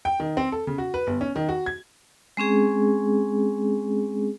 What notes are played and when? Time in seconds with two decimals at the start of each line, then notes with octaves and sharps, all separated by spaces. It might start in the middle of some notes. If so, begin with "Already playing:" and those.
0.05 G5
0.20 D#3
0.37 C4
0.52 A4
0.67 C#3
0.78 F#4
0.94 B4
1.07 G1
1.21 C#4
1.36 D#3
1.49 F#4
1.66 G#6
2.37 G#3 C4 C#4 G#4